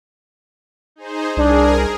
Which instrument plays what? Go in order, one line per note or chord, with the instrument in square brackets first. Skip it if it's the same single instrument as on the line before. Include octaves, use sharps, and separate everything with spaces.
[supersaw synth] D#4 G#4 C5
[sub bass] C2 [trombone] D4 [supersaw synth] G#4 A#4